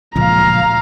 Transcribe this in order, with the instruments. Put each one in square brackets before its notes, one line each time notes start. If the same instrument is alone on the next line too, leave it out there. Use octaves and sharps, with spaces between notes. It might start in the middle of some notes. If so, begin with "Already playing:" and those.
[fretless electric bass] D1 C#2 [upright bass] A#2 F3 [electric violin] F5 A#5